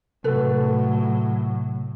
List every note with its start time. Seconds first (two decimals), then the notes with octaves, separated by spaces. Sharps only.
0.24 A2 C3 F#3 A3 A4 B4